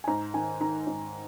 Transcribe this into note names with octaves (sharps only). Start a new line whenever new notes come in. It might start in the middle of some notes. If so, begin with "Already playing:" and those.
G#5
G#2 A#5
D#3 G#5
D#3 A#5
G#2